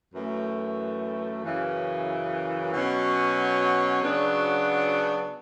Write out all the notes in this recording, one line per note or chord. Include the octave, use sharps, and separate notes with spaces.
F#2 E3 A3
F#2 C#3 E3
B2 F#3 C#4
C#3 F#3 B3 D4 F#4